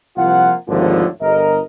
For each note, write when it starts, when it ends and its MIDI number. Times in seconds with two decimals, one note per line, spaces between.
0.17 0.53 36
0.17 0.53 53
0.17 0.53 58
0.17 0.53 65
0.17 0.53 78
0.68 1.06 32
0.68 1.06 39
0.68 1.06 45
0.68 1.06 50
0.68 1.06 53
1.21 1.60 31
1.21 1.60 70
1.21 1.60 75